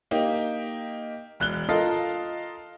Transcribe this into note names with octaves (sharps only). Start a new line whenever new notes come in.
A#3 D#4 G4
E1 F#6 G7
F4 A4 A#4 D#5 F5